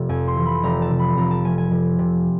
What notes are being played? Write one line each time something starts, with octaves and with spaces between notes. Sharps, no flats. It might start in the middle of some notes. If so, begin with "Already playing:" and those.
Already playing: F1 C3
F2 G#5
C6
E3
B5
F1 A#5
A5
C3
B5
F2 A#5
A5
F3 G#5
G#5
F1
C3